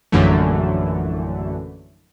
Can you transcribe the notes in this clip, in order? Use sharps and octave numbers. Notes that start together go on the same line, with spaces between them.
A#1 F#2 D3 E3 A3